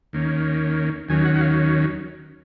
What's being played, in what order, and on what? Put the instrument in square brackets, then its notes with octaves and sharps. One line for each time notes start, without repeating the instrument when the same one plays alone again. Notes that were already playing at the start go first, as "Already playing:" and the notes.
[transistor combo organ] D#2 D#3 A#3 C#4
D#2 D#3 F#3 C#4 G#5
F#5
F#5
F5